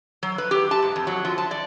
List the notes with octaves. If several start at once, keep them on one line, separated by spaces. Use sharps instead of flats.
F#3
B4
G4
A5
G#2
F2
F#3
F3
A5
D5